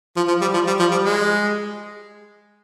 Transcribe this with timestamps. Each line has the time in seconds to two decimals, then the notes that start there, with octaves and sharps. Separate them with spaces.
0.16 F3
0.28 F3
0.41 G3
0.54 F3
0.67 G3
0.79 F3
0.91 G3
1.04 G#3